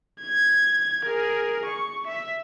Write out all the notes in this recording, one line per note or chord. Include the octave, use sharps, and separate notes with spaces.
G#6
G#4 A#4
C#6
E5